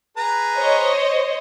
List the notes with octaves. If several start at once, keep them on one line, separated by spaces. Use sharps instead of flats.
G#4 B4 A#5
C5 C#5 D#5